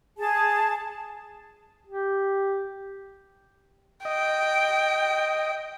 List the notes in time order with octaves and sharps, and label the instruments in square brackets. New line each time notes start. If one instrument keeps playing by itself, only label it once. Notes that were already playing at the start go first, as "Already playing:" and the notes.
[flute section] G#4 A5
[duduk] G4
[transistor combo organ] D#5 [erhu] G5